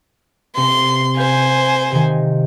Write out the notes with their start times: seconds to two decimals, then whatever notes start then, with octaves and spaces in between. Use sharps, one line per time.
0.56 C3 C4 C6
1.17 C5 F5 G#5 G6 B6
1.91 C3 D#3